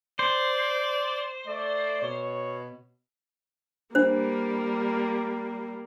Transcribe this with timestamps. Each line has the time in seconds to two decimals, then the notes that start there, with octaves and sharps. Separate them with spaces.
0.19 C5 D5
1.47 A3 D5
2.02 B2 C#5
3.95 G3 A#3 D4 C5